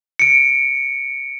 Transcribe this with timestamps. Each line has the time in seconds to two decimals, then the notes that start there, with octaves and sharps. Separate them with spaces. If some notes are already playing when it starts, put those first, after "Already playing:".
0.19 C#7 D7